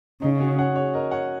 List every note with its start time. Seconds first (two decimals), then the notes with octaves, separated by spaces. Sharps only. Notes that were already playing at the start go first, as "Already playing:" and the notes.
0.22 C#3 D#4
0.40 C#4 F#4
0.58 C#5 F#5
0.76 G#4 C#5
0.94 A#4 D#5
1.11 C#5 F#5